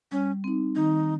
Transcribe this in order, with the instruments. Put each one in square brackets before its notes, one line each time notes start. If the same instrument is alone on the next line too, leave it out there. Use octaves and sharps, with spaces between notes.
[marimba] G3 [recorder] C#4
[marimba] C4 D#4
[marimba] D#3 [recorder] D#4